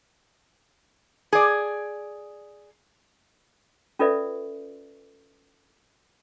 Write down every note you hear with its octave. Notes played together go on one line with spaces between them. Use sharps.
G#4 D5
C#4 F4 A4 B4 D5 E5